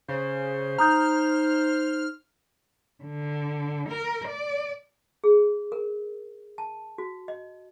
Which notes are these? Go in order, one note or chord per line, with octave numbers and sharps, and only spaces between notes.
C#3 C5
D#4 A#5 D#6 F6 G6
D3
A#4
D5
G#4
A#4
A5
F#4
D#5